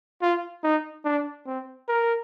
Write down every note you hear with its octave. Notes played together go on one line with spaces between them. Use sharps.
F4
D#4
D4
C4
A#4